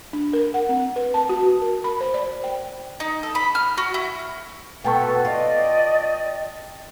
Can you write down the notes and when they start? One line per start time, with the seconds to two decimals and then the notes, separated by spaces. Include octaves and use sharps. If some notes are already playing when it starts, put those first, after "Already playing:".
0.13 D4
0.33 A#4
0.54 F#5
0.69 C4
0.96 B4
1.14 A5
1.29 F#4
1.62 A#4
1.84 B5
2.01 C5
2.14 D5
2.44 G5
3.00 D#4
3.23 A4
3.35 B5
3.55 F6
3.78 F#4
3.94 E4
4.84 B2 B3 A4 B4 G5 A5 C#6
5.25 F4 D5 D#5